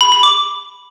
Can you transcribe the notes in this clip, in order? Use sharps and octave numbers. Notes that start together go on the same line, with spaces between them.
B5
B5
D6